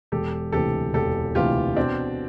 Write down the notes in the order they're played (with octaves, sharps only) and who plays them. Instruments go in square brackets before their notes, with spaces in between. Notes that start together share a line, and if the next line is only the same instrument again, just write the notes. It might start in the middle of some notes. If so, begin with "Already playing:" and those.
[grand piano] E1 [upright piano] G4 A4
[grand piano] D2 C3 E3 [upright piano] G4 A4
[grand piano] E1 [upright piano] G4 A4
[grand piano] D2 C3 E3 [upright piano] F4 G4
[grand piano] B2 [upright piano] C4 D4